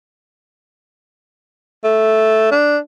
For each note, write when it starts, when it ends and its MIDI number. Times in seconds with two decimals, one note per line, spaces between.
1.84 2.50 57
2.51 2.78 62